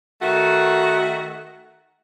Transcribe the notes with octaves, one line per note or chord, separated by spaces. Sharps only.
D#3 A3 F#4